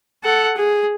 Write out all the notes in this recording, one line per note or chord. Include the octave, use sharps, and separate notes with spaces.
A4 F#5
G#4